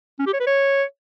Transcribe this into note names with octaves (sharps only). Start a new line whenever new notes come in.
C#4
G4
C#5
B4
C#5